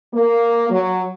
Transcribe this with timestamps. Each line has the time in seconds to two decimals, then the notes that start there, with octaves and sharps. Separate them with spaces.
0.14 A#3
0.70 F#3